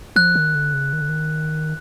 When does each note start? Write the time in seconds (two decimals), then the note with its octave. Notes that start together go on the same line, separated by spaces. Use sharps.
0.16 F3 F#6
0.36 D#3
0.55 D3
0.74 C#3
0.93 D#3
1.01 D3
1.09 D#3